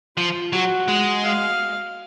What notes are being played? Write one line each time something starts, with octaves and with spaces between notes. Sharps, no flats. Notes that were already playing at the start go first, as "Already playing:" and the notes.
F3 F4
F#3 F#4
G#3
F5